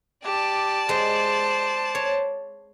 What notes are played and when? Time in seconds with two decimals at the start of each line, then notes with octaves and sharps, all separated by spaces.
0.25 G4 D5 A5
0.89 G#3 C5
1.95 C#5